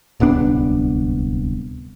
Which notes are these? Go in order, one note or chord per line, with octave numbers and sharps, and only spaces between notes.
D1 C2 B3 D4